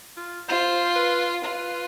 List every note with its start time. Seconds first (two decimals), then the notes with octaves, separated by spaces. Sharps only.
0.17 F4
0.49 F4 C5
0.96 B4
1.43 F4 B4